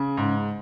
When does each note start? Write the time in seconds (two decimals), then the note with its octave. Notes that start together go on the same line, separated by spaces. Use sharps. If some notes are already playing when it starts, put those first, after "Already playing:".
Already playing: C#3
0.17 G#2